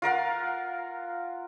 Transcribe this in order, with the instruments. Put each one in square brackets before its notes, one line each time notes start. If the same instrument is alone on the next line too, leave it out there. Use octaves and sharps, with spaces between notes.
[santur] F4 A#4 F5 F#5